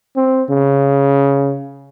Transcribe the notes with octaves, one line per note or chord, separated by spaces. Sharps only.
C4
C#3